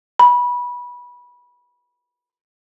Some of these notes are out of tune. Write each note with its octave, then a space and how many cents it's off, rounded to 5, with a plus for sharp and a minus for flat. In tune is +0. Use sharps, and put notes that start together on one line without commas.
B5 -20